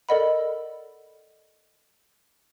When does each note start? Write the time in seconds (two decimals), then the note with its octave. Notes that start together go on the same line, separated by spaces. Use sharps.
0.09 A4 A#4 D5 D#5 F#5 B5